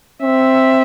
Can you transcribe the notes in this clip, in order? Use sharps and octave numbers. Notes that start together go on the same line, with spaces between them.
C4 E5